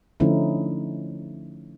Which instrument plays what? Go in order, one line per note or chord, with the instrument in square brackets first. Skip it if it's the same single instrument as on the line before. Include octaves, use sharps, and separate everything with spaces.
[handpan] D3 F3 A3 C#4 D#4 E4